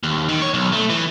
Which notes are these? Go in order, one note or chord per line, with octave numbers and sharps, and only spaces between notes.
D#2
D#3
C#5
B1
A3
E3